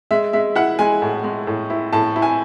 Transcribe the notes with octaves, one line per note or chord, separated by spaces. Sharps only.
G#3 E5
G#3 E5
E4 F#5
G#3 G#5
A2
G#3
A2
E4
A2 A5
E4
G#5